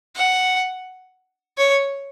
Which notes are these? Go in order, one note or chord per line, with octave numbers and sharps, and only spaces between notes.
F#5
C#5